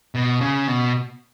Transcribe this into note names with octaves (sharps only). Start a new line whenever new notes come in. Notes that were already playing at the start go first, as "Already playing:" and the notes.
B2
C#3
B2